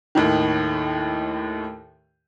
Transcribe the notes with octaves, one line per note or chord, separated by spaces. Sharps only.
D#2 A2 D#3